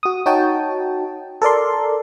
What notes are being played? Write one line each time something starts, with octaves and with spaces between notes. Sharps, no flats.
F#4 D#6
D#4 F#4 C#5 G5 A5
A4 A#4 D5 C6